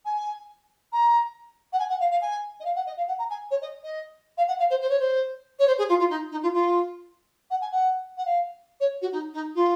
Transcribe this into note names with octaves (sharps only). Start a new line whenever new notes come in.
G#5
A#5
F#5
G#5
F#5
F5
F5
G#5
D#5
F5
F#5
D#5
F5
F#5
A#5
G#5
C#5
D#5
D#5
F5
F#5
F5
C5
C5
C#5
C5
C#5
C5
G#4
F4
F4
D#4
D#4
F4
F4
F#5
G#5
F#5
F#5
F5
C#5
F#4
D#4
D#4
F4